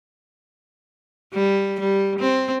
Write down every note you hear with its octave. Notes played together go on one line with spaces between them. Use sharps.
G3
G3
C4